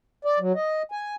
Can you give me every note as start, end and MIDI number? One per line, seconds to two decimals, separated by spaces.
0.25 0.39 74
0.40 0.52 54
0.55 0.82 75
0.92 1.15 80